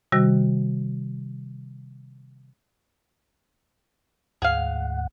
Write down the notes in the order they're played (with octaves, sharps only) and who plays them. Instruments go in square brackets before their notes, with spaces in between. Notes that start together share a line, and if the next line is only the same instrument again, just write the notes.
[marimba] C3 D#3 G3 F#4 A#6
[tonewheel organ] D2 G#2 F#5 [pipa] G#4 F5